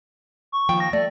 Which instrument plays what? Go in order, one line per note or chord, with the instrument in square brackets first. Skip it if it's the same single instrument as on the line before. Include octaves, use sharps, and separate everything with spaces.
[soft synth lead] C#6
[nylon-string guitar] D#2 F3 G5
[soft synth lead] A#6
[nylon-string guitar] A3 [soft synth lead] D5